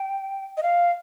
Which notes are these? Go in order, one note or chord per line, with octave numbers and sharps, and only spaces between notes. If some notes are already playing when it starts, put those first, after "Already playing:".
Already playing: G5
D#5
F5